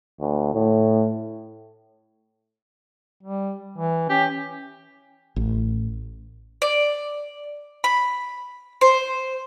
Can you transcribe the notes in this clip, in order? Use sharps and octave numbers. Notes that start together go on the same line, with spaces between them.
D2
A2
G3
E3
C#4 G4
A1
D5
B5
C5